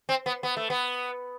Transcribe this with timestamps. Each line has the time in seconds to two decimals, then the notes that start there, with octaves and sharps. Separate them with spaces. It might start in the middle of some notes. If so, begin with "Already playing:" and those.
0.09 C4
0.26 B3
0.43 B3
0.57 A3
0.70 B3